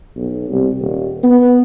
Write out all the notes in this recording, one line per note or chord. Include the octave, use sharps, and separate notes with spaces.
B1
C2
D#1
B3